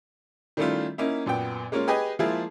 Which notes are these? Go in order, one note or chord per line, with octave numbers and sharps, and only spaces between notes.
D#3 G3 A3 C#4 E4 F4
A#3 C#4 D#4 E4
F#2 A#2 B3 G5
G#3 A#3 C#4 F4 C#5
G4 G#4 B4 D#5 G#5
F3 G#3 A#3 E4 F4 G#4